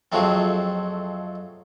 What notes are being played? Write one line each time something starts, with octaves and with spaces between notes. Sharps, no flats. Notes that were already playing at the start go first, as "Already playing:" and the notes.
F2 F3 F#3 G#3 A3 C4